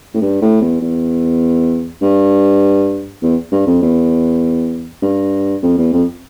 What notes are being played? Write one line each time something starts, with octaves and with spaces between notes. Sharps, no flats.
A2
G2
A2
E2
E2
G2
E2
G2
F2
E2
G2
F2
E2
F2